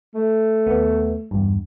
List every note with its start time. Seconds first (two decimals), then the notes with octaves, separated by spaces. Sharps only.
0.15 A3
0.67 D#2 B3
1.31 E2 G2